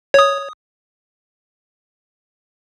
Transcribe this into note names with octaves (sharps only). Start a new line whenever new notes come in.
C#5 D#6